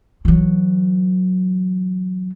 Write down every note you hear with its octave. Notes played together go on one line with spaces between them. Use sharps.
E3 F#3